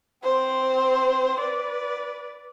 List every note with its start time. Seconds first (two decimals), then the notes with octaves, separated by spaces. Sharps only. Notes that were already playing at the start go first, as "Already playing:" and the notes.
0.24 C4 C5
1.41 B4 D5